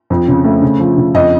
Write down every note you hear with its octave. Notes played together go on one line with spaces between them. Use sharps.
F2
C#3
A3
C#3
F3
C#3
F2 D#5